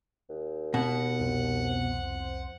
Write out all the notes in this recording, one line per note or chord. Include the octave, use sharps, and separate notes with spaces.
D#2
B2 F#5
C2 F2 C5